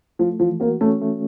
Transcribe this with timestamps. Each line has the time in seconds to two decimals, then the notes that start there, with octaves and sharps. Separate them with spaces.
0.19 F3 A3
0.40 E3 F3
0.60 A#3 F#4
0.81 A3 C#4
1.02 A3